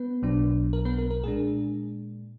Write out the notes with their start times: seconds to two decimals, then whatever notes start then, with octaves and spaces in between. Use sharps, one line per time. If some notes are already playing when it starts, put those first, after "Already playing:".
Already playing: B3 B4
0.22 B1 B2 F#3 D4
0.73 A#4
0.85 B3 B4
0.99 A#4
1.11 A#4
1.23 A#2 G#3 D4 G#4